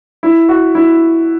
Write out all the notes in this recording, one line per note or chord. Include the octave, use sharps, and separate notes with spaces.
E4
F#4
E4